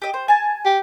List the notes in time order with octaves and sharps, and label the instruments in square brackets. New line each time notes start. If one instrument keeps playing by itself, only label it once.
[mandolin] G4 D#5
C5
G#5 A5
[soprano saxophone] G4